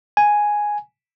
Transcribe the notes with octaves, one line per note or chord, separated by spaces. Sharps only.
G#5